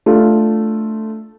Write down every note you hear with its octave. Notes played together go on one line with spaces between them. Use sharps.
A3 D4 F4